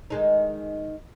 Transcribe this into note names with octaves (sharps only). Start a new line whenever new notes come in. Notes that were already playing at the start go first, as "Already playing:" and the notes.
D#3 G#3 D#4